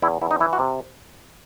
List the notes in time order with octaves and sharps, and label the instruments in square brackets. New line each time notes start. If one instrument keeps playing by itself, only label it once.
[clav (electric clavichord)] E2 E4
E2 E4
D#4
E3 E4
F#4
C3